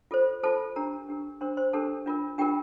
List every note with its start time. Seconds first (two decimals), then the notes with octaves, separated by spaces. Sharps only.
0.11 F4 A4 C5
0.43 F4 A4 C5 A5
0.76 D4 G4 A#4 A#5
1.09 D4 G4 A#4
1.41 D4 G4 A#4 C5 C6
1.57 C5 C6
1.73 D4 G4 A4 A#4 A5
2.06 D4 F4 A#4
2.38 D4 F4 G4 A#4 G5